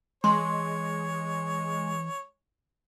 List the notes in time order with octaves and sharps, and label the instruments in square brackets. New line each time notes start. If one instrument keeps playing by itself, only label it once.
[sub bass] E3 [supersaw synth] G#3 [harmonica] C#5 [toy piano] C6